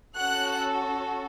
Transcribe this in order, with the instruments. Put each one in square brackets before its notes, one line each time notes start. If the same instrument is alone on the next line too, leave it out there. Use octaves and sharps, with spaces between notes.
[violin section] C#4 F#4 A4 F#5 F#6